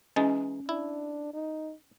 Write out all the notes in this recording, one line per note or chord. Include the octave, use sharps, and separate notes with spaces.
E3 G#3 C#4 D#4
D4 E4
D#4